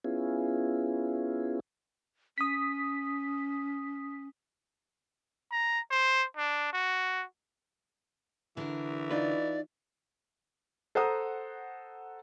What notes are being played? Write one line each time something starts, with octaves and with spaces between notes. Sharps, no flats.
B3 C#4 E4 F4 G#4
C#4 D#6 B6
A#5
C5
D4
F#4
D3 E3 A#4
D#4 F4 B4 D5
A4 C5 F#5 A#5 D#6